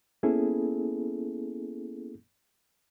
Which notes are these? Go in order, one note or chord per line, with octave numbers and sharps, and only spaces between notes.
A#3 B3 C#4 E4 G#4 A4